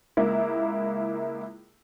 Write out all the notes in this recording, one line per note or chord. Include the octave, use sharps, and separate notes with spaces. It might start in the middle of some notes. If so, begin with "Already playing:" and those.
C#2 A#3 E4